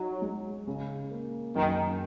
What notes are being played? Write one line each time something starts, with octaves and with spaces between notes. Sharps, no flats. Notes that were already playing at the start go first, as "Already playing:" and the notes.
Already playing: F#3 D#4
G#3
C#3
A#3
F#2 D#3